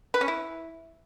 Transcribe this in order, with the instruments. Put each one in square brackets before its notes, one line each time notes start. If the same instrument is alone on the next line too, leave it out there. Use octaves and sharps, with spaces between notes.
[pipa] B4
C#4
E4